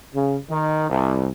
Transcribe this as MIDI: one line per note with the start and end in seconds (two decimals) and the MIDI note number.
0.13 0.36 49
0.48 0.88 51
0.90 1.28 36